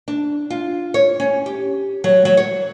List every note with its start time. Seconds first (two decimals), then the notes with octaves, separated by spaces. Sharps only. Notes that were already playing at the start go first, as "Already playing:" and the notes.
0.08 D4
0.50 F4
0.94 C#5
1.20 C#4
1.46 G4
2.04 F#3
2.25 F#3
2.37 C#5